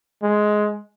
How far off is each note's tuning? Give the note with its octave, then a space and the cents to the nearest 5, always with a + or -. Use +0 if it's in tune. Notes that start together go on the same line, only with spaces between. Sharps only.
G#3 +10